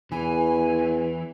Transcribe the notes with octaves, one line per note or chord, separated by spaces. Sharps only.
E2 E3 G#5